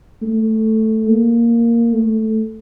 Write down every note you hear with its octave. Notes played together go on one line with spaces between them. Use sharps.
A3
A#3
A3